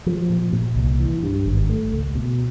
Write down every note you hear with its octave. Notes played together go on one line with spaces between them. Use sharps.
F3
A#2
A#2
C2
E3
G2
G#1
A3
C#2
B2